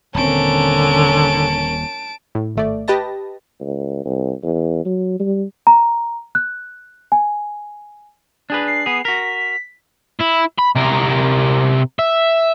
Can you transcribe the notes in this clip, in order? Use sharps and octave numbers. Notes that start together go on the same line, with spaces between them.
D#1 D3 C4 C#4 A#4 A5 D7
A2
G#1 A3 D5
G4 B4 D#5 A5 A#6
C#2
C2
E2
F#3
G3
A#5
F#6
G#5
D4 G#4 B4
C7
B3 G#4
F#4 A#4 B6
E4
B5
C3 A#4
E5